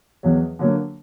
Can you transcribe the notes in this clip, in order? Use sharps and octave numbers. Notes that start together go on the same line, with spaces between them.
E2 B2 F#3
D3 F#3 A#3